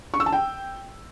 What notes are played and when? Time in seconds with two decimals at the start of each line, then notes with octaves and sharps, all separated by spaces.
0.14 C#6
0.20 E6
0.26 A5
0.33 G5